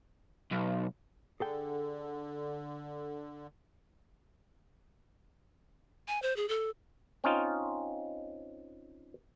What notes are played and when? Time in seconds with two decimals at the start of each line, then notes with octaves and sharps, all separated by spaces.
0.51 B1
1.40 D3 G#4 A4 G5
6.08 G#5
6.22 C5
6.36 G#4
6.49 A4
7.24 C4 C#4 D#4 F4